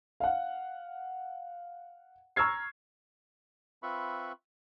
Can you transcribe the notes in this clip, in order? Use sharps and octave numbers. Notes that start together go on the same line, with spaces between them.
F5 F#5
A#5 C#6 E6 F6 G#6 C7
C4 F4 B4 E5 B5 C#6